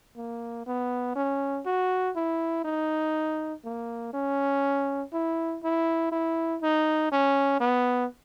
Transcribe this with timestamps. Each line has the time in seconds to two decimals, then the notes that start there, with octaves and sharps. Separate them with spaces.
0.17 A#3
0.67 B3
1.16 C#4
1.66 F#4
2.16 E4
2.65 D#4
3.65 A#3
4.13 C#4
5.13 E4
5.63 E4
6.12 E4
6.62 D#4
7.12 C#4
7.61 B3